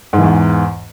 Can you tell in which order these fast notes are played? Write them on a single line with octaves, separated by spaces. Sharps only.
G#2 E3 E2